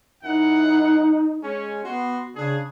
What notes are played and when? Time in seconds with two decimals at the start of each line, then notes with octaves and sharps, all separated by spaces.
0.24 F#2 D#4 E4 F#5
1.43 G#3 C#4
1.84 B3 F#4 C6
2.36 C#3 D4 G#4